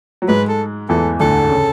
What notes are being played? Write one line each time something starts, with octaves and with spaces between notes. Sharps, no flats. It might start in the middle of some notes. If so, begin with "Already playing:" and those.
F#3
G#2 G#3 B4
A4
E2 E3 A4
D2 D3 A4
C#3